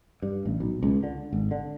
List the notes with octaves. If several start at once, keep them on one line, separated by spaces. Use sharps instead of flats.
G2
A1
B1
C#2
D3
G#1
D3